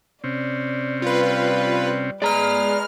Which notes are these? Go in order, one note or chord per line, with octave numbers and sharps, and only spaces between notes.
C3 C4 C#4 D5
G3 F4 B4
G#3 B4 D5 A#5 F6